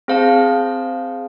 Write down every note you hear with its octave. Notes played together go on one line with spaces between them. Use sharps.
C4 G#4 C5 F5 A5